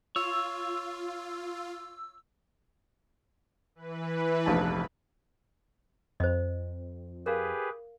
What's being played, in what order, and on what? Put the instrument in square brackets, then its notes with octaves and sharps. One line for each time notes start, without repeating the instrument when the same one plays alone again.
[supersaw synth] F4 [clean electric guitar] C#5 [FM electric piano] E6
[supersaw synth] E3 B4
[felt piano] F1 A#1 A5
[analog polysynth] F2 [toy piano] C5 D#5
[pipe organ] G4 G#4 B4 [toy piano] A#4 F5